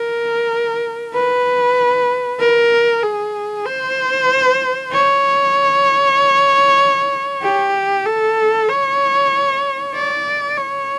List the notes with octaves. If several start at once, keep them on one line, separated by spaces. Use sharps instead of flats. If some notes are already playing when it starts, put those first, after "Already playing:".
Already playing: A#4
B4
A#4
G#4
C5
C#5
G4
A4
C#5
D5
C#5